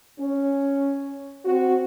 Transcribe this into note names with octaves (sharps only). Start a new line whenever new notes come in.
C#4
C4 F#4